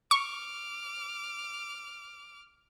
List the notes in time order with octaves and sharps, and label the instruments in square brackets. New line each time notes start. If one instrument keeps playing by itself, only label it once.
[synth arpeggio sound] C#6 [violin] D6 F6